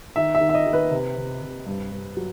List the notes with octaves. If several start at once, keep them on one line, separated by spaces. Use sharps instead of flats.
D#3 E5
E5
D#3
E5
D#5
D#3
B4
C3
C3
C3
G2
G2
F#3